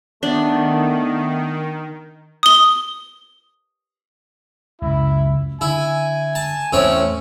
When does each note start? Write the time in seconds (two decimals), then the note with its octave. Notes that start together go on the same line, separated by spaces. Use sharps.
0.23 D#3 A3 B3 D4
2.43 D#6 G7
4.82 C#2 F#2 E4
5.61 D3 E4 G#5
6.35 A5
6.73 E2 A2 C4 C#4 C#5